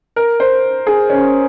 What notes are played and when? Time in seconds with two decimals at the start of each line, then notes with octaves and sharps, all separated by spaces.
0.16 A#4
0.40 C5
0.87 G#4
1.10 C#4